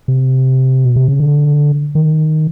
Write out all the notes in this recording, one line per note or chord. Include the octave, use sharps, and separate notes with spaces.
C3
B2
C3
C#3
D3
D#3